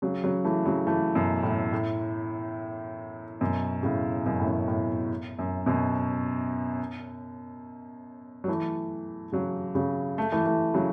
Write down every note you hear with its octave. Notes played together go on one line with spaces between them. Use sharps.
C#3 F#3
C#3 F#3
E3 A3
C#3 F#3
E3 A3
F#2 B2
A2
A2
F#2 B2
A2 C#3
F#2 B2
A2
F#2
A2
F#2
F#2 B2
F#3
E3 A3
C#3 F#3
C#3 F#3
A3
E3 A3
E3 A3
C#3 F#3